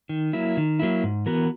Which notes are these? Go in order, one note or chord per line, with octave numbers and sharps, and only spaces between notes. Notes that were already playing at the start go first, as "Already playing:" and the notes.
D#3
F#3 A#3 E4
D#3
F#3 A#3 E4
G#2
E3 B3 F#4 A#4